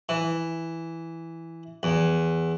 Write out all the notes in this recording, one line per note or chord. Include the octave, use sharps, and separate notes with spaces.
E3
E2